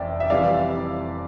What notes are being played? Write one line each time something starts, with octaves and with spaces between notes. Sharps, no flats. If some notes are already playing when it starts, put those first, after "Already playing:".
Already playing: F1 F2 E3 D5 E5 G5
E5
F1 F2 E3 G3 D5 F5